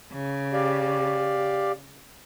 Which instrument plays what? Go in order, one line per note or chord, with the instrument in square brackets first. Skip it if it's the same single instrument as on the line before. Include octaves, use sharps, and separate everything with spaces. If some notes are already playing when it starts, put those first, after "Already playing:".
[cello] C#3
[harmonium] G4 D5 F5